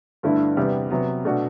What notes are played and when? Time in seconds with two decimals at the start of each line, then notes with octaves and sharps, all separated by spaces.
0.23 G1 G2 D3 A3 E4
0.57 E2 C3 G3 B3
0.90 C3 F#3 B3
1.25 B2 A3 D4 F#4